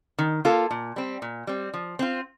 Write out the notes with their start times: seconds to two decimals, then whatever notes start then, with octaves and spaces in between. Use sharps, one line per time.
0.19 D#3
0.45 A#3 F4 A4
0.71 A#2
0.96 G3 C4
1.22 A#2
1.47 G3 C4
1.74 F3
1.99 C4 F4